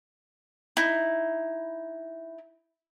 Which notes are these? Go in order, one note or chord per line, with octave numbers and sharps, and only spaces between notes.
D#4 E4